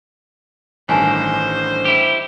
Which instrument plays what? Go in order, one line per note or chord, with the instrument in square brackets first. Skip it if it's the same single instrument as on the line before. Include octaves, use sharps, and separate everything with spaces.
[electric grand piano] A1 G2 D#3 [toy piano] A#4 G#5 A5 [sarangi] C5
[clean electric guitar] E4 G4